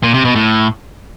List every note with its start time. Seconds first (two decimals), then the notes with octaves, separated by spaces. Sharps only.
0.03 A#2
0.14 C3
0.25 B2
0.36 A2